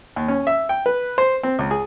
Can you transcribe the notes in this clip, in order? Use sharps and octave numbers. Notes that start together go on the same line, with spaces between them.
D#2
C#4
E5
G5
B4
C5
C4
C#2
G#4